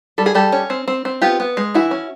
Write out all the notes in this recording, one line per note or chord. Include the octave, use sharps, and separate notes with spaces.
G3 A4
G#4
G3 G4 A4
C#4
C4
C4
C4
B3 F4 G4
B3
G#3
E3 E4 F#4
C#4